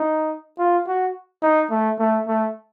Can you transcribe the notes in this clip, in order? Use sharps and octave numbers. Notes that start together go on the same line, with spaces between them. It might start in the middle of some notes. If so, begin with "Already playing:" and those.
Already playing: D#4
F4
F#4
D#4
A3
A3
A3